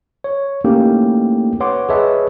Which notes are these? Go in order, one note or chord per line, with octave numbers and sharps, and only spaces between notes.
C#5
A3 A#3 C#4 D#4 E4 G4
B4 C#5 F#5 C6 D6
G#4 B4 C#5 D#5 E5 A5